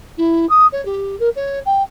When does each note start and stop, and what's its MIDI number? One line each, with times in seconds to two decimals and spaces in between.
0.17 0.46 64
0.49 0.67 87
0.72 0.83 73
0.85 1.18 67
1.19 1.29 70
1.36 1.59 73
1.65 1.82 79